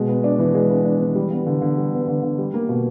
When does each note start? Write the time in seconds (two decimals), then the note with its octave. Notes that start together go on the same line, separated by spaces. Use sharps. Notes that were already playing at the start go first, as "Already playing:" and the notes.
Already playing: B2 G#3
0.09 B3
0.24 D4
0.39 E3
0.55 G#3
0.69 B3
0.85 D4
1.00 E3
1.15 G3
1.31 B3
1.46 D3
1.62 D3
1.77 G3
1.93 B3
2.08 D3
2.23 D3
2.38 G3
2.54 A#3
2.69 B2